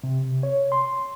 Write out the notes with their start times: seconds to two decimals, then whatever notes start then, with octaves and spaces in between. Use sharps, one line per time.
0.04 C3
0.43 C#5
0.72 C6